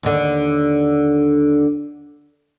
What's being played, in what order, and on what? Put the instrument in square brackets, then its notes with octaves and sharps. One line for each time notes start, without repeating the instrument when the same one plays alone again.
[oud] D#2 D3